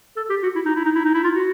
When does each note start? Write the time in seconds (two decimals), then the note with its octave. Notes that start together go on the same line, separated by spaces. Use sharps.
0.17 A4
0.30 G4
0.43 F#4
0.55 E4
0.65 D#4
0.76 E4
0.85 D#4
0.95 E4
1.05 D#4
1.14 E4
1.24 F4
1.34 F#4